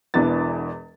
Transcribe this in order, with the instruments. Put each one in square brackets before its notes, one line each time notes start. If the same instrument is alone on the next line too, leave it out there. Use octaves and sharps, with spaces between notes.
[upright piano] E1 E2 E3 B3 D4 A6